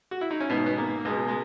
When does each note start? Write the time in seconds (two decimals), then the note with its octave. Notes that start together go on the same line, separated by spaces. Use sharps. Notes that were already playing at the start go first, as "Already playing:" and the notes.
0.11 F#4
0.21 E4
0.31 D#4
0.40 C#4
0.50 G#1 G#2 B2 D#3 B3
0.66 B3
0.78 A#3
1.05 C#2 B2 G#3
1.28 G#3